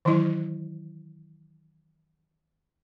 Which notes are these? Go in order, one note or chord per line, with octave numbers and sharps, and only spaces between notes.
D#3 E3 F#3 E4 D#5